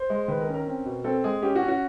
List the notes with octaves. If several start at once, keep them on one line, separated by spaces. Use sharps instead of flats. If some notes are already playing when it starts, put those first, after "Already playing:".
Already playing: C5
G#3
D#3 B4
A#4
C#4
A#4
C4
B2
C4 A4
G#3 G#4
C#4 G4
F#4
C#4
F#4